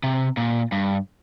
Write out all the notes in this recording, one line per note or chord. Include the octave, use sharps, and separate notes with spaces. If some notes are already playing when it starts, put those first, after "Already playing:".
C3
A#2
G2